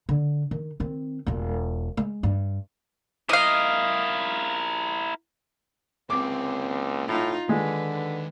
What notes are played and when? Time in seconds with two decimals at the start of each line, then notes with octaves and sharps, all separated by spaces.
0.09 D3
0.51 D#3
0.80 D#3 C4
1.27 E1 F4
1.97 G#3
2.23 G2
3.29 E4 A#4 D#5 F5
6.10 C#2 A#3 C4 C#4 D6
7.08 A2 D#4 F4
7.49 D#2 D3 G#3 B4